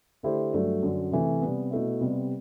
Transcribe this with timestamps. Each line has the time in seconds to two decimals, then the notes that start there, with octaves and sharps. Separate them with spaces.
0.23 D3 A3 E4 G4 C5
0.53 G2 F#3 A3
0.83 F#2 D3 F#3
1.12 C3 E3 A3
1.42 C3 G3 B3
1.71 B2 A3 E4
2.01 C3 G3 B3